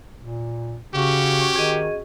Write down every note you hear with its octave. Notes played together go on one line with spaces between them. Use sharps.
A#2
C#3 C#4 F#4 G4
D#3 G#4 D#5